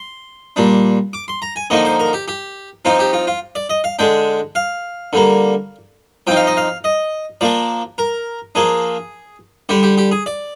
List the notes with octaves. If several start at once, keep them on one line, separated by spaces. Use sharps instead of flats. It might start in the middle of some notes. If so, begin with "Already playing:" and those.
Already playing: C6
A#2 G3 D4
D6
C6
A#5
G#5
D3 F3 A#3 D#4 D#5
C5
A#4
G4
G4
F3 C4 D#4 F4
G4
F4
F4
D5
D#5
F5
D3 G#3 D4 G5
F5
D3 G3 A#3
F3 C4 D#4 G5
F5
D#5
F5
D#5
F3 A#3 D4 D5
A#4
F3 A#3 D4 G#4
D3 G3 D4 G4
G4
G4
G#4
D5